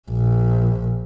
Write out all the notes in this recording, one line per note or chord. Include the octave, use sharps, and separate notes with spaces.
A#1